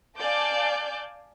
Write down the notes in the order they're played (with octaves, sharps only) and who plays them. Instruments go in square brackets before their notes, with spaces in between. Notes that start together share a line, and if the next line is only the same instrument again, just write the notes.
[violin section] D5 F5 G#5 A5 D6 G6